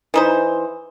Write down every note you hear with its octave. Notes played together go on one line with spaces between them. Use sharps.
E3 D#4 C5